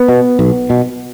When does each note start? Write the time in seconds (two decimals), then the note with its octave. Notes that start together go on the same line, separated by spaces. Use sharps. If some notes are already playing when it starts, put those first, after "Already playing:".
Already playing: B3
0.08 B2
0.39 B1
0.70 B2